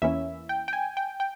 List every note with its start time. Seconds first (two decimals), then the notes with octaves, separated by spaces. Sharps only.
0.02 E2 E3 A#3 C#4 E4 E5
0.49 G5
0.68 G5
0.73 G#5
0.97 G5
1.20 G5